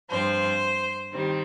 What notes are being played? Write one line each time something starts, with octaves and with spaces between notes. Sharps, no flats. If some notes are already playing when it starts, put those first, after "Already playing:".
G2 F3 C4 C5
D#3 G3 C4